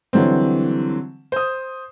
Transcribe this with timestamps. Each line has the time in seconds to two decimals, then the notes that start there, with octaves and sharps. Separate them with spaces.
0.13 D3 E3 F#3 G3 C4
1.32 C5 D#6